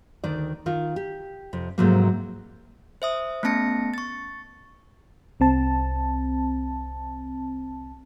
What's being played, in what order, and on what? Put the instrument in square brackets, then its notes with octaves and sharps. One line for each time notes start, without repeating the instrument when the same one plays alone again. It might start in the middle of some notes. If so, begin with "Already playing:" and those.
[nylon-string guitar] D2 D#3 D5
D#3 F4 A#4
G4
F2 C3
G#2 C3 F3 F#3 A3 A#3
[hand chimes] C5 E5 D#6
A3 B3 C#4 A5 A#6 C#7
C#6 A6
[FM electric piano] C2 C4 A5